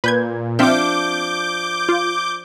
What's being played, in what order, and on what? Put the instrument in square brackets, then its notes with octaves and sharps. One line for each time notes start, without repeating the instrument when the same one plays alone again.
[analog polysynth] A#2 [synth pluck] B4 G6 G#6
[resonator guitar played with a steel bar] F3 D4 [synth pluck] C4 E5 F6 [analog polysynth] D6 G6
[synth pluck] F4